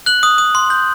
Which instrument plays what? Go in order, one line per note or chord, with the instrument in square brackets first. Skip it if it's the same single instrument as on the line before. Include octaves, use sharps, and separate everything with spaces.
[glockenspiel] F#6 F#7
D#6
D#6
C6
G6